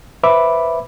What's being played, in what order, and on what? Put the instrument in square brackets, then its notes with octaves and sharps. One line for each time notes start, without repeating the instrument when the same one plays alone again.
[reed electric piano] B4 C5 E5 B5 D6